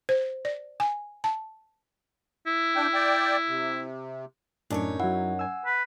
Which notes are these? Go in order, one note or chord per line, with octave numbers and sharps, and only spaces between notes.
C5
D5
G#5
A5
E4
D4 G5
D5 G5
C3
F#2 A2 D4 D#4 C#5
F#3 E4 F#5
G#5 E6
B4